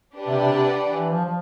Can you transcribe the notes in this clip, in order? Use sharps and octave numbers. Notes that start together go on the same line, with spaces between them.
D4 G4 B4 D5 F#5
C3
C3
C3
E3
F3
F3